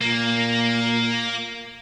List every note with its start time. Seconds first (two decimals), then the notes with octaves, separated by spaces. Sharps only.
0.01 A#2 A#3